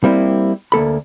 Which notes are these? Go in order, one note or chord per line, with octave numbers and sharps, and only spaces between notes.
G3 A#3 C4 E4
D2 A#3 A4 B5